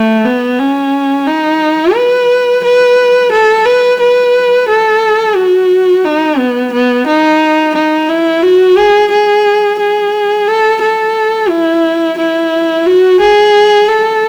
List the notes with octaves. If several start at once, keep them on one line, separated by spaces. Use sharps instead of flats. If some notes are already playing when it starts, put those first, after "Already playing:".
Already playing: A3
B3
C#4
D#4
B4
B4
A4
B4
B4
A4
F#4
D#4
B3
B3
D#4
D#4
E4
F#4
G#4
G#4
G#4
A4
A4
E4
E4
F#4
G#4
A4